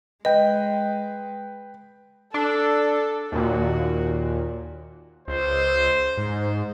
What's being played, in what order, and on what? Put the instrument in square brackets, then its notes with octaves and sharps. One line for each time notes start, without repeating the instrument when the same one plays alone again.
[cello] G#3 [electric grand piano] B4 G5 [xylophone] D#5
[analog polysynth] D4 [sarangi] A4
[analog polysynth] D#2 A#2 [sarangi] F#4
[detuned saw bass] C#2 [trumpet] C5
[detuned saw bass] G#2